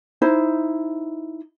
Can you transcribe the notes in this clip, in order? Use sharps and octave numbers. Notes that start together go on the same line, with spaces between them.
D#4 E4 C5